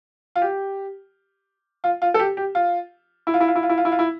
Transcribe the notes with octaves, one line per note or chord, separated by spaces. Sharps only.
F4
G4
F4
F4
A4
G4
G4
F4
E4
F4
E4
F4
E4
F4
E4
F4
E4
F4
E4